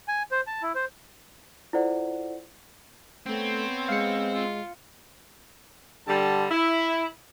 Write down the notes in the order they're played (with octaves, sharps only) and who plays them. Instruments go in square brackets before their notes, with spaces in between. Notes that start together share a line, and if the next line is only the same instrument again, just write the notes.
[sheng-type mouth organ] G#5
C5
A5
E4
C5
[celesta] E4 F4 A4 C5 D5 F#5
[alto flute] A3 [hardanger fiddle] B3 C#5 [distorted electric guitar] C4
[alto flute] G#3 [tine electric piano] F5 C#7
[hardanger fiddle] F4
[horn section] D3 G3 A5
E4